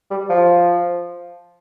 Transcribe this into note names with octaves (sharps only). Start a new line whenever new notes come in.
G3
F3